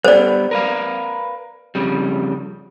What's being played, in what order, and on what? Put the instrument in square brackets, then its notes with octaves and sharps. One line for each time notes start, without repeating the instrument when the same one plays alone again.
[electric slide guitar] G3 B3 [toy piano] C5 D5
[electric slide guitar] A#4 B4 F5
F2 C#3 G3